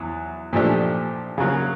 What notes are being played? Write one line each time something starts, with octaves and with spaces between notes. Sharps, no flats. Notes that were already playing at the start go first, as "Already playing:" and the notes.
Already playing: E2 F#3
A#2 F3 A3 D4 G4
C#3 F#3 A#3